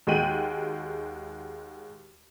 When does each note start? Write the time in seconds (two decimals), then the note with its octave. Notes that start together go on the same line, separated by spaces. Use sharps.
0.07 D#2 G#3 F#4 G5 D#7 F#7